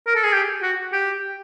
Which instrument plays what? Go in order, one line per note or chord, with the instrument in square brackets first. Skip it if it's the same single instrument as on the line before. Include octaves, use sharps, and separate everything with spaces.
[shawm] A#4
A4
G#4
G4
F#4
G4